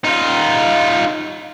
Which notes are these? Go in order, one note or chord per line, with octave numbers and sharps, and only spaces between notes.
D#4 F4